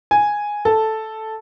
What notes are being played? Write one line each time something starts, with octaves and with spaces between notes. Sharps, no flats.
G#5
A4